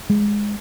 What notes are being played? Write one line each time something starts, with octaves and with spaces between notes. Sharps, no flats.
G#3